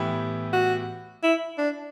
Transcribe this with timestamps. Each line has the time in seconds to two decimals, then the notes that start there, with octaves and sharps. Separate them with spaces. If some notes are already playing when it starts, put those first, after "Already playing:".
Already playing: A2 E3 B3 E4 G4
0.53 F#4
1.23 E4
1.58 D4